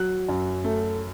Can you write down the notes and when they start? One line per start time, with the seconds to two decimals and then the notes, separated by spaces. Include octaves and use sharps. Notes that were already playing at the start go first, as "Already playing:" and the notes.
Already playing: F#3 F#6
0.29 F#2
0.64 A3